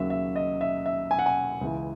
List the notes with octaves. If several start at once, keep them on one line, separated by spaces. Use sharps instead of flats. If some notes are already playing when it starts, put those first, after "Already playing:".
Already playing: D#2 C#3 F#3 E5
E5
D#5
E5
E5
G#5
F#5
G#5
C#2 C#3 E3